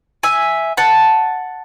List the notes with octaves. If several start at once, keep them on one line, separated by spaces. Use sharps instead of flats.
E5 G#5
F#5 A5